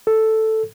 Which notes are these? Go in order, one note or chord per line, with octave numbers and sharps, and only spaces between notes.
A4